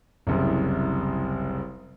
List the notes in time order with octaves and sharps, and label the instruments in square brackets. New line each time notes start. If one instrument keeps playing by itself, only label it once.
[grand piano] F#1 C2